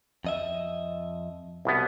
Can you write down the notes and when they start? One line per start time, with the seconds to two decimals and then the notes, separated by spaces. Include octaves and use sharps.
0.25 F2 D#5 E5
1.65 C2 B2 B3